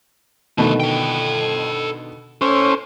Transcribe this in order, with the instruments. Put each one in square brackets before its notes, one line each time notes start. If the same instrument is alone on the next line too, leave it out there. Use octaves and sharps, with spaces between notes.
[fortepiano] B2 D3 D#3 [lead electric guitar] F3 A3
[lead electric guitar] A4 G5
[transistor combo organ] C#4 C5 [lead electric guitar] A4 C#5